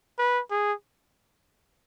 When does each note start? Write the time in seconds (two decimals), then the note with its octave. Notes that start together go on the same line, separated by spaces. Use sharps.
0.19 B4
0.51 G#4